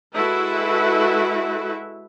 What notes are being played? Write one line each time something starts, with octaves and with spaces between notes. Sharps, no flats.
G#3 E4 F#4 A4 B4 E5